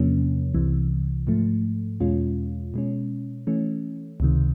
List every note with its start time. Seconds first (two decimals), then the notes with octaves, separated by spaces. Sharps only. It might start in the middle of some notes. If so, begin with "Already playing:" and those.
Already playing: E2 C3 F3 A#3 C#4
0.54 C2 C3 E3
1.27 G#2 F3 A3
2.00 E2 B2 G#3 C#4 F4
2.74 B2 G#3 C#4
3.47 E3 A3 C#4
4.20 C#2 C3 D#3